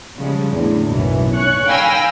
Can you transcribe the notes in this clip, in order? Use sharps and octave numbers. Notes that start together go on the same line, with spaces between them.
C#3 F3 G3 G#3
E2 A2 D3
B1 F#2 B2 E3
C#4 C#5 C#6 F#6
F5 G5 G#5 B5 E6 A#6